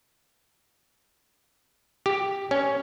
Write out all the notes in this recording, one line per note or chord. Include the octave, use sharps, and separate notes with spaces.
G4
C#4